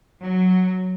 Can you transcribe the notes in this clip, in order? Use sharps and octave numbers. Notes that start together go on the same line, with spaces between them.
F#3